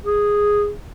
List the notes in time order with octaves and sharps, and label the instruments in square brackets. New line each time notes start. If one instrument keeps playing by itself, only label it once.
[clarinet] G#4